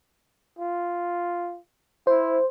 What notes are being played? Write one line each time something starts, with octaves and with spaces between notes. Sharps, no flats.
F4
E4 C5